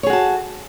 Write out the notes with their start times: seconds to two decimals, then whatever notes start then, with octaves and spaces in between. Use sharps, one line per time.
0.03 C#5
0.07 G#4
0.10 F#4
0.13 A5